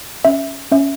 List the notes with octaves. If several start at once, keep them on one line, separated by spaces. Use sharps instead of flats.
C#4 E5
C#4 E5